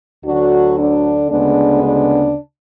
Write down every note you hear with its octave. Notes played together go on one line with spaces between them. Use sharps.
D2 D3 F#3 D4 F#4
D4
D2 C#3 G#3 B3 D4
D4